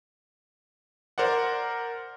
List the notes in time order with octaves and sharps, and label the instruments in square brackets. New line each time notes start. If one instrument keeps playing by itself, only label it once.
[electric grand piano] A#4 C5 D5 F#5